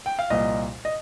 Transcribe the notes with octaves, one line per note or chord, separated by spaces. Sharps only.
G5
F5
C2 A#2 F3 A#3 D#5
D#5